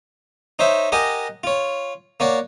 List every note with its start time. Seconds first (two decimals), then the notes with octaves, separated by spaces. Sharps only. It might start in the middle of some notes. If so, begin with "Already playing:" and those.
0.59 D#4 C5 C#5 E5
0.92 G4 A#4 D#5 F#5 G#5
1.44 F4 C#5
2.20 A#3 C#5 D5 F#5